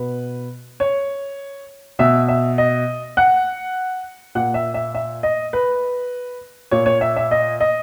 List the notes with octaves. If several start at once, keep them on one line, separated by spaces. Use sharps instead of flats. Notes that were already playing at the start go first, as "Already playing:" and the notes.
Already playing: B2 B4
C#5
B2 E5
E5
D#5
F#5
A#2 F#5
E5
E5
E5
D#5
B4
A#2 C#5
C#5
E5
E5
D#5
D#5